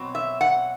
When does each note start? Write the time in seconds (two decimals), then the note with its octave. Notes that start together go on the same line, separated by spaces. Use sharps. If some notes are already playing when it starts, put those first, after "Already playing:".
Already playing: B2 F#3 C4
0.15 E5
0.41 F#5